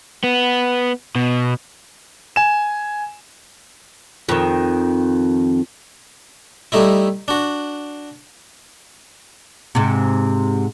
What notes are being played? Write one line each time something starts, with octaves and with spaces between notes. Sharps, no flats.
B3
B2
G#5 E7
F2 D#3
G3 A3 D#4 E4
D4 F#4
G#2 C3